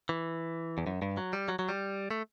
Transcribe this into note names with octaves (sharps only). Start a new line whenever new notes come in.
E3
E2
F#2
G2
F#3
G3
F#3
F#3
G3
A3